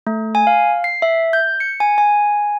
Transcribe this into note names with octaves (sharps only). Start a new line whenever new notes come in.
A3
G#5
F5
C7
E5
G6
C#7
G#5
G#5